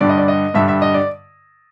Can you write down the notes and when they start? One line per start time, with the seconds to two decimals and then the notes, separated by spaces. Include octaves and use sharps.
0.01 G2 D3 G3 D5
0.09 D#5
0.18 D5
0.28 D#5
0.54 G2 D3 G3 E5
0.68 E5
0.82 D#5
0.94 D5